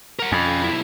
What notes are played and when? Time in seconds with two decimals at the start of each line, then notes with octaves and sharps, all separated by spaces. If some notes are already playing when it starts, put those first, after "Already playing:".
0.19 A#4 F#5
0.32 F2 C#4 B5
0.64 B1 E4